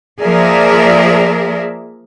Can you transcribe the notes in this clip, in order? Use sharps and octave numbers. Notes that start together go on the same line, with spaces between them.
F3 A#3 G#4 A#4 D5 E5